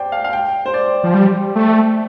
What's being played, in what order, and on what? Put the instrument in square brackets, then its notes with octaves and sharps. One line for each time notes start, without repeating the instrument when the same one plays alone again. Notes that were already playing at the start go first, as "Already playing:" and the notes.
Already playing: [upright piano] C5 D5 G5
F5
F5
G5
C5
D5
[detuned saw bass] F3
G3
A3